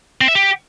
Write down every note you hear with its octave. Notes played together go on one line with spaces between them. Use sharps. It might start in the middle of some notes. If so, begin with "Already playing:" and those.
C4
E5
G4